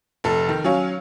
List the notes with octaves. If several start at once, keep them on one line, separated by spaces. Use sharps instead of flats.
F1 A4
D#3
F#3 C#4 C#5 F5